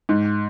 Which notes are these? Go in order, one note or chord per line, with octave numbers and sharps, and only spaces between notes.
G#2